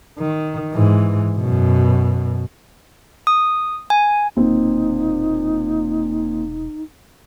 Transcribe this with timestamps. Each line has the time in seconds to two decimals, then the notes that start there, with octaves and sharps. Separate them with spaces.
0.18 D#3
0.72 G#2 E3
1.37 F#2 B2
3.27 D#6
3.90 G#5
4.37 E1 A#2 C4 D#4